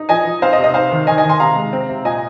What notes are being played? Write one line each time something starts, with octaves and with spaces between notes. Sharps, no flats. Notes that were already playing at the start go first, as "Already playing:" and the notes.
Already playing: D#4
F3 D#5 G#5
F3
C4 C5 F5
D#5
C3
D#5
D#4 C5 F5
D#3
D#3 D#5 G#5
D#5 G#5
D#3
G#5 C6
C3 F5 A#5
G#3
C4
C3
A#2 D#5 G#5